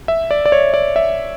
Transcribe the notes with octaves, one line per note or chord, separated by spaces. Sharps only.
E5
D5
D5
C#5
D5
E5